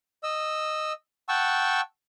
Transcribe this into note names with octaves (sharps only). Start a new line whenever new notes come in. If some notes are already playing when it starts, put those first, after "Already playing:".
D#5 E6
F#5 G5 A5 C#6 E6